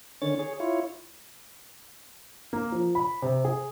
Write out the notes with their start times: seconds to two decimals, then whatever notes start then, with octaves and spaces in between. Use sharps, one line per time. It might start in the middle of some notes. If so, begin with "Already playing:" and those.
0.22 D3 D#3 C#4 C#5 A6
0.39 G#4 C#5
0.60 E4 F4 C#5
2.53 A#3
2.72 F3
2.95 B5
3.22 C3
3.45 G#4